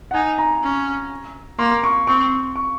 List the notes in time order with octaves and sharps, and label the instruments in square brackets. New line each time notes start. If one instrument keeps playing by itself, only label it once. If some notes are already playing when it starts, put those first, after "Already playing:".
[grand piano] F#5
[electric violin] D#4 [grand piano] G#5
[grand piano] A#5
[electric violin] C#4
[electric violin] A#3 [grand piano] C6
[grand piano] C#6
[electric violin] C4 [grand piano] C#6
[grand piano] C#6